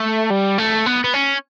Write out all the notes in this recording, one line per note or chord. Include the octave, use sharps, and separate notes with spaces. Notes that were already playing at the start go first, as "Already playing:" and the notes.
Already playing: A3
G3
A3
B3
B3
C#4